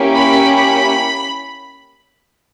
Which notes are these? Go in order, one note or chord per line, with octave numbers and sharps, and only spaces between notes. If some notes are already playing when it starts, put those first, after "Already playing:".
Already playing: A#3 C#4 E4 G4
B5
B5